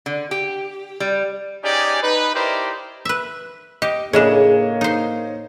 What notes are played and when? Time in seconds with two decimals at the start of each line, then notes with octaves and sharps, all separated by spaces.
0.06 D3
0.31 G4
1.00 G3
1.63 C#4 D#4 G4 G#4 D5
2.02 D#4 B4
2.34 D#4 E4 G4 A#4 C5 D5
3.05 B4 E5
3.82 G4 D#5
4.13 A2 C#3 A#3 D4 G#4 C#5 D#5 E7
4.81 D#4 C5